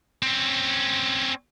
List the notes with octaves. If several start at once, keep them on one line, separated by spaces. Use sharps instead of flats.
C4 C#4